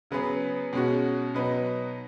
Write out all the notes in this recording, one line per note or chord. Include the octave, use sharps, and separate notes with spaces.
C#3 F#3 B3 G#4 B4
B2 G#3 C#4 F#4
B2 F#3 D#4 B4